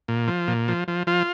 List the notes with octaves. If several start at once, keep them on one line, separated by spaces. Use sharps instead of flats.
A#2
F3
A#2
F3
F3
F3 F4